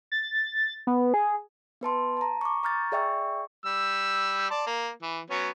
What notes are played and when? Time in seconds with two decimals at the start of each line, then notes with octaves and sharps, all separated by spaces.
0.12 A6
0.87 B3
1.14 G#4
1.81 B3 B4 A5 C6
2.17 A5 A#5
2.41 C#6 D6
2.63 A#5 C#6 F6 G6 A6
2.92 G#4 D5 E5 G5 C#6 E6
3.66 G3 E6
4.50 D5 A5 C6
4.67 A#3
5.02 E3
5.30 F#3 B3 C#4